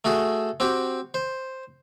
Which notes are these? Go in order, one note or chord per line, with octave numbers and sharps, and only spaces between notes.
A3 F#4 G#4 A4
C4 F#4 G4
C5